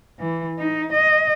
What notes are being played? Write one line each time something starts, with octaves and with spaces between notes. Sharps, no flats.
E3
D#4
D#5